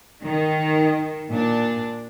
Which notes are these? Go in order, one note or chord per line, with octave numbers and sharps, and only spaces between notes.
D#3
A#2 D4